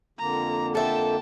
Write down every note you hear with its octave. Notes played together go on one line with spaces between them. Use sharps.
F2 D3 A#3 A#5
A4 E5 G5 A5